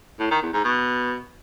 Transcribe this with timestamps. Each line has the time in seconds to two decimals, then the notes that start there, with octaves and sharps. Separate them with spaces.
0.20 A2
0.31 D#3
0.42 E2
0.53 G#2
0.65 B2